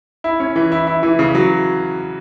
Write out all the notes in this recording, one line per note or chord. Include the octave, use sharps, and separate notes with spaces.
E4
C#4
E3
E4
E4
E3
C#3
F#3